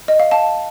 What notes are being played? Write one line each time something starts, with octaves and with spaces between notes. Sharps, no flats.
D#5
F5
F5 A5